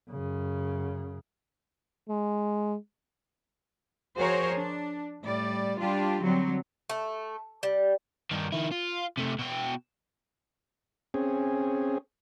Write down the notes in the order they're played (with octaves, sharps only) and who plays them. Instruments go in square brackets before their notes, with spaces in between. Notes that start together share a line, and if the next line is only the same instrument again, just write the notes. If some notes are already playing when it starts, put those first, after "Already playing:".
[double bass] F#2 C#3
[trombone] G#3
[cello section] F3 F#4 G#4 A#4 C5 C#5
D4
A2 G3 D5
G3 D4 F4 G4
D3 F#3 G3 C4
[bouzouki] A3
G3
[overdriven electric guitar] G2 D#3
D#3 E4
F4
C3 A3
B2 G5
[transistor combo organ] C4 C#4 G#4